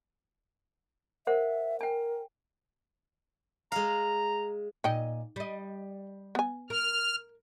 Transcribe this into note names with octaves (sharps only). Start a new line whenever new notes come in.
A#4 C5 E5 F#5
A#4 G5 G#5
G#3 F5 A#5
A#2 D#4 D#5 G5
G3 D#5
B3 G#5
A#4 F6